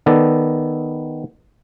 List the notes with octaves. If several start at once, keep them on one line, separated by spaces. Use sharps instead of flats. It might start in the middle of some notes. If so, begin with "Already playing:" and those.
D#3 B3 A4 D5